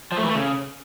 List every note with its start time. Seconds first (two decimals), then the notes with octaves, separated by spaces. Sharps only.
0.12 F3
0.17 A3
0.23 E3
0.29 A3
0.35 C#3